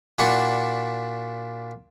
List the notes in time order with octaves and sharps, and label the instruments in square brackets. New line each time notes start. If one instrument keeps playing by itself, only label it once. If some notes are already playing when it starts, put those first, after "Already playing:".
[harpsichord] A#2 D4 E4 F#4 F#5 C#6